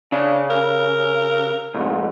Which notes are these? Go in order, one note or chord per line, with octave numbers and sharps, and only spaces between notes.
C#3 D4
A#4
C2 F2 G#2